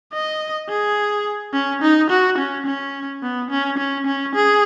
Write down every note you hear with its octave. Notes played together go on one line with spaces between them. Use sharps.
D#5
G#4
C#4
D#4
F#4
C#4
C#4
B3
C#4
C#4
C#4
G#4